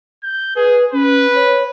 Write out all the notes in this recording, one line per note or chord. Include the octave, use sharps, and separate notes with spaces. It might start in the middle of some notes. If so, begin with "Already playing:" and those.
G6
G#4 B4
C#4 B4
C#5